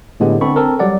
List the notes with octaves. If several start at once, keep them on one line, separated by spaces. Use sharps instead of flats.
A2 D3 G#3 B3 G4
D3 C4 A4 B5 C#6
C4 A4 A#4
F#3 G3 D5 F#5